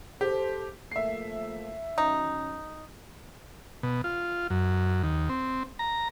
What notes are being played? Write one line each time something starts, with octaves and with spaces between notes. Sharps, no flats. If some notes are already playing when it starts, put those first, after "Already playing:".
G4 A4 C5
F3 A3 A#3 E5 C7
D#3 F#3 C#4 D#4
B2
F4
F#2
D#2
C4
A#5